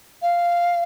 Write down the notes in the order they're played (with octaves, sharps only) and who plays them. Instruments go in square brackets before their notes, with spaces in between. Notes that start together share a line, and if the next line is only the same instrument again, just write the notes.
[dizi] F5